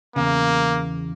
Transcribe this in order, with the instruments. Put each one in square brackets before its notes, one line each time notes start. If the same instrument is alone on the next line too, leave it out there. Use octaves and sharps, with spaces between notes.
[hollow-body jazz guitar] E2 C#3 [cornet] A#3